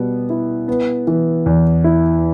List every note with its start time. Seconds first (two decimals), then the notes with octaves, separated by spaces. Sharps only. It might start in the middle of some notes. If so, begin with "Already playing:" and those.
Already playing: B2 G3 B3
0.30 E4
0.68 B3
1.07 E3
1.46 E2
1.84 E4